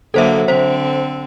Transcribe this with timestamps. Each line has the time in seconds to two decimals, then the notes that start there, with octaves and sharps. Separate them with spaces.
0.14 D3 F#3 A#3 A4 C5 E5
0.48 D3 C4 C5